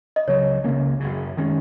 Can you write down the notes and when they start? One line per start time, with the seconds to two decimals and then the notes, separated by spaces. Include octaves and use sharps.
0.16 D#5
0.27 C#2 C#3 F#3 C#5
0.64 C#2 C#3 A#3 C#4
1.00 F#1 F#2 C#3
1.37 D#3 G#3 C#4